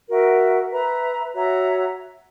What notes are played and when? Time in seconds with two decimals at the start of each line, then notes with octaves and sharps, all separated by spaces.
0.09 F#4 A#4 E5
0.71 B4 E5 A#5
1.34 F#4 C#5 E5 A#5